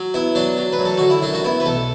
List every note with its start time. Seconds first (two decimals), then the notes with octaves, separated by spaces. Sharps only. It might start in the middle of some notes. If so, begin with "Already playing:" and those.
Already playing: F#3
0.14 B3 E4
0.35 F#3 D4
0.57 F#3
0.73 B4
0.79 F#2
0.85 A4
0.98 D3 F#4
1.10 E4
1.22 F#2 D4
1.34 F#4
1.44 B3 E4
1.60 B4
1.66 B1 A4